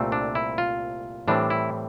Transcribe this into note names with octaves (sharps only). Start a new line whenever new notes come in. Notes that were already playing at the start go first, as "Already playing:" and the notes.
Already playing: C2 A#2 A3 C4
D4
E4
F4
A2 E3 G3 C4 D4
E4